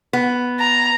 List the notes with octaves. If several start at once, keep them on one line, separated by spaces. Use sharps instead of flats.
B3
A#5